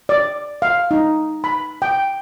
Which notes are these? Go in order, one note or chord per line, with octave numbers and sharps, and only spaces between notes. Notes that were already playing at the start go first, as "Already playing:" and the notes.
D5
F5
D#4
B5
G5